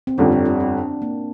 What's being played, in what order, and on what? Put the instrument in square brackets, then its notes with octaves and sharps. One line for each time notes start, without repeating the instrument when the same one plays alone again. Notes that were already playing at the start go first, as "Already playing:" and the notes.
[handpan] C4
[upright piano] G1 F2 D3 G3 [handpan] D4
[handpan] D4
D4
C4
A#3